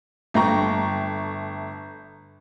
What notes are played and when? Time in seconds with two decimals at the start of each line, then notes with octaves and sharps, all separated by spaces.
0.34 G1 A3 G5 A#5 C#6